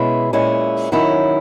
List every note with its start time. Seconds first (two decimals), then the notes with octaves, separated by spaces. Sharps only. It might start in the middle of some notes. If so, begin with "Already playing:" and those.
Already playing: B2 G#3 C#4 E4
0.33 A#2 G#3 C#4 E4
0.92 D#3 F#3 C#4 E4